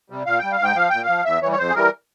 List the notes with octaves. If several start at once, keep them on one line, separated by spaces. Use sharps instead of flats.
C3 G3
A#2 F5
G3 G5
F5
G#2 G5
F3 F5
A#2 G5
F5
F3
E2 E5
E3 G3 C#5
C#5
F2 C5
G#4
E3 G3 A#4